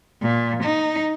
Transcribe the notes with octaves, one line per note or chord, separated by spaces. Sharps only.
A#2
D#4